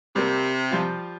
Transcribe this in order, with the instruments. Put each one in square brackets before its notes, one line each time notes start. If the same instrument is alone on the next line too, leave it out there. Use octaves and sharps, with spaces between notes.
[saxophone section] C3 [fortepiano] G3 A#3
[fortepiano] F3 G3 F4